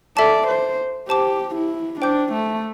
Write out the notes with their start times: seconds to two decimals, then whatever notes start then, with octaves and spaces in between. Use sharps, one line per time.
0.17 A4 D5 E5 A5
0.48 C5
1.09 G4 C5 A5 D6
1.55 E4
2.01 D4 C5 G5 D6 G6
2.33 A3